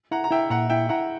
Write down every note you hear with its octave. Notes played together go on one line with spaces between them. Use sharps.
E4 F#5 A#5
A#5
E4 E5 G5
A#2 F#5 A#5
E4 E5 G5
E4 F#5 A#5